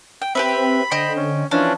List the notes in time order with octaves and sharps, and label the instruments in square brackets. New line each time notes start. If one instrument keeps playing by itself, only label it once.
[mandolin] G5
[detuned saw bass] C4 [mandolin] G4 B4 E5 [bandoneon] B5
[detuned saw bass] D3 [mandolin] C5 D#5 G5
[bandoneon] C#4
[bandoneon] E3 F3 C#4 [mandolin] D4